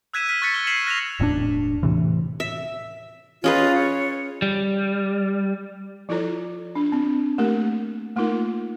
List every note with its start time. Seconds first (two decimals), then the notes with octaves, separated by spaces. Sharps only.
0.14 E6 F#6 G#6 B6 D#7 E7
0.28 F6 B6 D#7
0.42 C#6 F#6 A6 B6 C#7
0.54 F6 G7
0.67 B6 C7 E7 F#7
0.87 F#6 A#6 B6 E7 F7
1.20 E1 A2 C4 D4
1.83 A2 C3 E3
2.40 E5
3.44 C#4 F4 G#4 B4 D#5
3.74 C#5
4.42 G3
6.09 F3 E4 F4 A4 C#5 A#5
6.75 D4
6.92 C4
7.38 A3 A#3 G4 A#4
8.16 A3 A#3 D#4 F4 A#4